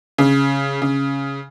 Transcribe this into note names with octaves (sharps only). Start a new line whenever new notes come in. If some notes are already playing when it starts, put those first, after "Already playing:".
C#3
C#3